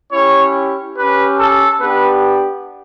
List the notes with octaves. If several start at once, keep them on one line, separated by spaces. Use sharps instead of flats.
C#4 E4 G4 C#5
C#4 G4 B4
A4
B3 D4 G4 B4